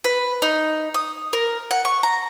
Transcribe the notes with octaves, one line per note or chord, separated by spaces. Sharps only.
B4
D#4
D#6
A#4
F#5
C#6
A#5